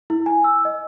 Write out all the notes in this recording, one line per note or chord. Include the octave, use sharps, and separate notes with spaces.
E4
G#5
E6
D#5